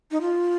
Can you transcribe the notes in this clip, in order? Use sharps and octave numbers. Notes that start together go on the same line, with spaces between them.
D#4
F4